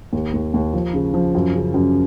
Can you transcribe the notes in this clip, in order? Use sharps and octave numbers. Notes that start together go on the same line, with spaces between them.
D#2
D#2
D#2
F3
C#3
F3
F#2
C#3
F#2